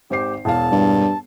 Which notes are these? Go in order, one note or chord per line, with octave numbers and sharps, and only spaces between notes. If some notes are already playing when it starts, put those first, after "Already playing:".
G#1 G4 C5 C7
E1 E2 F5 A5
G2